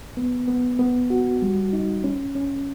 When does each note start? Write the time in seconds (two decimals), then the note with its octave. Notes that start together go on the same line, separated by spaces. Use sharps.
0.17 B3
0.48 B3
0.79 B3
1.10 F#4
1.42 G3
1.73 D#4
2.04 C#4
2.35 C#4